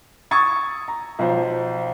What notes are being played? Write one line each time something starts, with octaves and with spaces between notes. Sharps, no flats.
C#6 D#6 E6 G#6 A6
A#5
B1 F3 C5